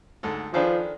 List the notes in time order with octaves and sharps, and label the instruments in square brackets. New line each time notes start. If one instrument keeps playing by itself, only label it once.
[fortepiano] D2 G#2 A4
[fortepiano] D#3 G#4 B4 [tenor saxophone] F3 [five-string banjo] D4 F4 A4